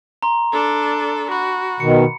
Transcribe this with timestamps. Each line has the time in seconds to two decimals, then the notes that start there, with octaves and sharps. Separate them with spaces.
0.23 A#5 C6
0.53 D4 A4
1.32 F#4 B5
1.80 B2 D#3 C#7